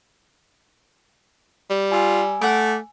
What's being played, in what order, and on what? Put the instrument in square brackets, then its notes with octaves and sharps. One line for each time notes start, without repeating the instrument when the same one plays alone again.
[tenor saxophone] G3
[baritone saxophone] F4 [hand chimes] G#5 E6
[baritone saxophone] A3 [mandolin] F#5 D6